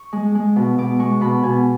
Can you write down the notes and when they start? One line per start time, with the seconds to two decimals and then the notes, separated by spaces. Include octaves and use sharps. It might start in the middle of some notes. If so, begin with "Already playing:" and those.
Already playing: C#6
0.13 G#3
0.35 G#3
0.56 B2
0.78 B2 D6
0.99 G#3 C#6
1.21 B2 B5
1.43 B2 G#5